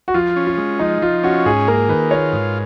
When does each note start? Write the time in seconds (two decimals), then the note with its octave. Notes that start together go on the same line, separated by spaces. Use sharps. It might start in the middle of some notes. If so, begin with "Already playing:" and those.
0.08 F#4
0.14 F3 F4
0.36 C#4
0.47 F4
0.57 G#3
0.79 F3 D#4
1.02 F3 F4
1.23 C#4 F#4
1.46 G#2 G#4
1.67 A#3 A#4
1.89 D#3 B4
2.11 F4 C#5
2.33 G#2